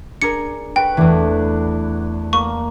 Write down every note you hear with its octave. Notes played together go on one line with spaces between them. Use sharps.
D4 G#4 A#4 C#7
B4 F#5 G5 C#6
E2 E3 A3 D4
A#3 C#6